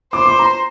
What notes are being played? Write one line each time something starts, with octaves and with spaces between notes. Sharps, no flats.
C5 D6
D6
A#5